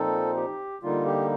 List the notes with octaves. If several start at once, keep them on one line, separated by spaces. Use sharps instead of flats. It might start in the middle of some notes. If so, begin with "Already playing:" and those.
Already playing: A#2 F3 C4 D#4 A4
G4
D3 G3 A#3 D#4 F4
G4